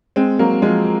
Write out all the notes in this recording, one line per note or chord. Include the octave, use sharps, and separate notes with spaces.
G#3 C4
F#3 A#3
F3 G#3